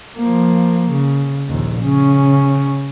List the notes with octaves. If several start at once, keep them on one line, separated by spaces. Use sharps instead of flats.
F3 A#3
C#3
A#1 D#2
C#3 C#4